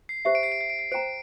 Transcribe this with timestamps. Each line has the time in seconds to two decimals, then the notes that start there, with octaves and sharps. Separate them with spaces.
0.09 C7
0.25 G4 C5 E5 C7
0.35 D7
0.43 C7
0.52 D7
0.61 C7
0.70 D7
0.79 C7
0.92 C5 G5 A#5 D7